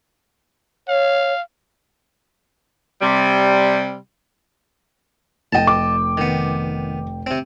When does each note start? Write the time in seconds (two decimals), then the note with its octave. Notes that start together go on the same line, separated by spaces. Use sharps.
0.88 C#5 F5
3.01 C3 G3
5.53 F1 D#5 G5 A5
5.67 D6
6.17 D#3 B3
7.26 C3 C4